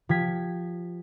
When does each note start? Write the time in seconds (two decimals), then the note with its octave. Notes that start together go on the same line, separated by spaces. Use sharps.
0.09 F3 G4 G#6 B6